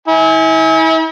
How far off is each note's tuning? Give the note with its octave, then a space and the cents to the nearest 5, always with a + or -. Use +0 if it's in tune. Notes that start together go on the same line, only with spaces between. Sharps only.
E4 -40 G#5 +0